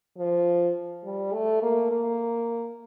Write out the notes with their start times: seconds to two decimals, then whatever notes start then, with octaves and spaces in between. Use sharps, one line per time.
0.18 F3
1.05 G3
1.33 A3
1.63 A#3
1.91 A#3